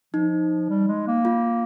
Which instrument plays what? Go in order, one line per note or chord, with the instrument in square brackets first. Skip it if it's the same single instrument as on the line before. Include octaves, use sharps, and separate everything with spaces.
[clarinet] F3 [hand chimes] D#4
[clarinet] G3
G#3
A#3
[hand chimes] F4